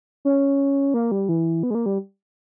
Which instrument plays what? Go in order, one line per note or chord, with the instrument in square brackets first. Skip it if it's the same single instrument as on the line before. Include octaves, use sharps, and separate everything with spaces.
[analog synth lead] C#4
A#3
G3
E3
B3
G#3
A#3
G3